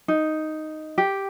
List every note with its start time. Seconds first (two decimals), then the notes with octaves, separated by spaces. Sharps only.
0.08 D#4
0.98 G4